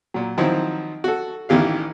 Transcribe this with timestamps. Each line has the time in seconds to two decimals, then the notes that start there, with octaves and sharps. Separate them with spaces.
0.14 A#2 F#3
0.38 D#3 F3 F#3 C4 D#4 E4
1.04 F#4 A4
1.49 A1 D#3 E3 G4 F5